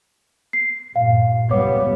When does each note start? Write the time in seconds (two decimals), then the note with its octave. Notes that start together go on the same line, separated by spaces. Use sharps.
0.53 C7
0.96 G2 A#2 F5
1.51 C#2 G3 B3 C#5 D6